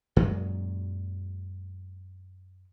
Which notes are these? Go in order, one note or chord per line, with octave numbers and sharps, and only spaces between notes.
F#2 A#2 F#3 G#3